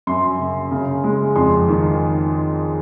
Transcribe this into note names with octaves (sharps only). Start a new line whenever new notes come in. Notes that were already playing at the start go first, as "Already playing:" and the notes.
F#2 C6
C#3
C#3
G#3
F2 C6
D#3